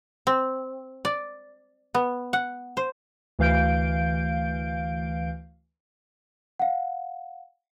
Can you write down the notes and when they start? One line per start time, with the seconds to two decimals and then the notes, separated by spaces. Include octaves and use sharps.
0.27 C4
1.05 D5
1.94 B3
2.33 F#5
2.77 C5
3.39 D2 E3 F5 G6 D7
6.60 F5 F#5